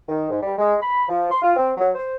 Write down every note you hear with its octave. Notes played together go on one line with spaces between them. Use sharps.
D#3
G#2
G3
G#3
B5
F3
C6
F4
C4
F#3
C5